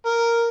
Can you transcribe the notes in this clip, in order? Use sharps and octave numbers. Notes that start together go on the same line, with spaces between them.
A#4